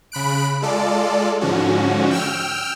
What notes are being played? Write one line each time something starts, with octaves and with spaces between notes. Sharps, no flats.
C#3 B5 F#6 D7
G#3 F4 A4 D5
G#2 D3 F3 C#4 F#4
G5 E6 F6